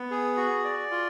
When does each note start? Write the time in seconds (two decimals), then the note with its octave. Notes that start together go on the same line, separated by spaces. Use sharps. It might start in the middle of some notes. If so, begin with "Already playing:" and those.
Already playing: B3
0.11 G#4
0.37 F#4
0.64 D5
0.91 F4